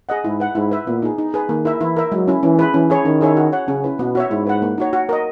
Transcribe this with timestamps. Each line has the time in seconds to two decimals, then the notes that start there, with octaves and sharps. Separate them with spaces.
0.09 G#4 D#5 F#5
0.24 G#2 E4
0.40 B4 F#5
0.55 G#2 E4
0.71 B4 E5
0.87 A#2 B3
1.02 D#4 G#4
1.18 D#4
1.34 G#4 B4
1.49 D#3 A#3
1.65 E4 A#4 E5
1.80 E3 E4
1.97 A#4 E5
2.12 F#3 G#3
2.28 C#4 E4
2.43 E3 C#4
2.59 E4 G#4 B4
2.74 E3 C#4
2.90 E4 G#4 C#5
3.05 D#3 C#4
3.21 E4 G#4 C#5 E5
3.37 F#4
3.53 C#5 F#5
3.68 C#3 C#4
3.84 E4 B4
3.99 B2 B3
4.15 F#4 C#5 E5
4.30 G#2 E4
4.47 B4 F#5
4.62 A#3
4.78 D#4 F#4 C#5
4.93 F#4
5.09 A#4 D#5